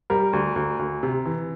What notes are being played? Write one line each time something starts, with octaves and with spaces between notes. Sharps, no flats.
G3 A#4
D2
D2
D2
C3
E3